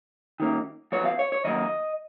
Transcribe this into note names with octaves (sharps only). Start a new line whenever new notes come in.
D#3 A#3 C#4
F3 B3 C#5
F5
C#5
C#5
D#3 F#3 A#3 D#5